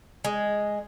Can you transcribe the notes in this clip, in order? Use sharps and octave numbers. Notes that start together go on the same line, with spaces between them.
G#3